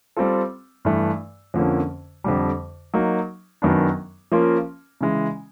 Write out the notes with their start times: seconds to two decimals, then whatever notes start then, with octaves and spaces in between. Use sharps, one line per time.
0.16 G3 C4 F4 A4
0.85 G2 E3 A3
1.54 F2 D3 F3 A#3 C#4
2.24 F2 D3 G3
2.94 F#3 A#3 D#4
3.62 F#2 D#3 F#3 B3 D4
4.32 F3 A#3 C#4 F4 A#4
5.01 C#3 E3 G#3